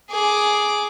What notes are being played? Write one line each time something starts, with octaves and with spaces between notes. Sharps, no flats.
G#4 D6